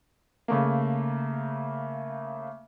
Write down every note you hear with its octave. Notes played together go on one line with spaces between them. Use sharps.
C#3 A3 A#3